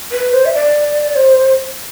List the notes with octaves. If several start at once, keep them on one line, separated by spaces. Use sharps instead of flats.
B4
C5
E5
D5
C5